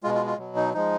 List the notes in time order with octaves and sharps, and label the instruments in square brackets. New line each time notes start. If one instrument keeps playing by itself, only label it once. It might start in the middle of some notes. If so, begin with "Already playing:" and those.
[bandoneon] G#3 F4
B2
F4
F4
B2 F#3
D#4
F3 G#3 D#4